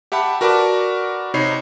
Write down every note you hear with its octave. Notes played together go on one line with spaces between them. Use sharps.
G4 E5 F#5 A5 B5
F#4 A#4 B4 D5 A5 D6
C3 D#4 C#5 B5 C7